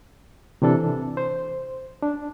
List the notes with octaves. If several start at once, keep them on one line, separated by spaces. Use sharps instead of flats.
C3 E3 D4 A4
C5
D4